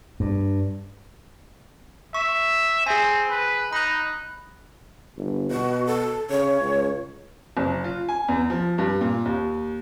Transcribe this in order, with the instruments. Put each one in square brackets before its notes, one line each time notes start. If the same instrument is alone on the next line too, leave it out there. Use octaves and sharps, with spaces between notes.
[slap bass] G2
[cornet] E5 [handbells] C#6
[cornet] C4 [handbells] G#4 G#5
[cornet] B4
[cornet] D#4 [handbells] B5 F#6
[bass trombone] G1
[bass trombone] B2 [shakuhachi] F#4
[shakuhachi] A4
[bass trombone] C#3 [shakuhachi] C#5
[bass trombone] C#2
[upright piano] F#1
F4
G#5
E2
F3
G2
A#2
D#2